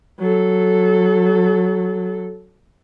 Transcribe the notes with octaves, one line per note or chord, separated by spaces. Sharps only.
F#3 A4